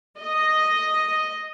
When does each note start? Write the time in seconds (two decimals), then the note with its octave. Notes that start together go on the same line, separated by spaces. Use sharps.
0.18 D#5